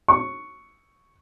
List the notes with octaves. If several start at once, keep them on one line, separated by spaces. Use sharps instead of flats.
C#6